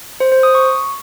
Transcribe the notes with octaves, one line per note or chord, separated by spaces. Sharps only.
C5
C5
D#6
C#6